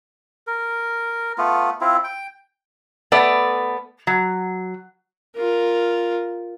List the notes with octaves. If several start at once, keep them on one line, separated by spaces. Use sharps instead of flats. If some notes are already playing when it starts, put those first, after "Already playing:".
A#4
A3 B3 F4
C4 E4 F4
G5
A3 B3 A4 D5
F#3
F4 A#4